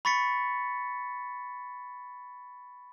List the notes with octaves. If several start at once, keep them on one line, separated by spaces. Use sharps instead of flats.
B5 C#6 A6 B6 C#7